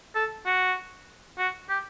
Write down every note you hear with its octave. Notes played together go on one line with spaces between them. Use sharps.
A4
F#4
F#4
G4